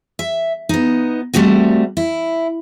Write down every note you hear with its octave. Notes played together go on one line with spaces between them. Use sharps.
E5
B3 D#4
G3 A3 C4 D#4 F#4
E4